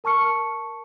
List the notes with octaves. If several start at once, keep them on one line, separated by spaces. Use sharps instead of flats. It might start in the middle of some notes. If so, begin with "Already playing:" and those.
A#4 A5 C#6 F6 C#7